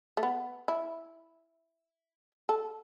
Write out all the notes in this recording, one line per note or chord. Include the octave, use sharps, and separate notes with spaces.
A3
B3
E4
A4